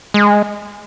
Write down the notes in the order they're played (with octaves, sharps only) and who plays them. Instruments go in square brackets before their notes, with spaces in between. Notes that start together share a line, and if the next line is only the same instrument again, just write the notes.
[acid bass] G#3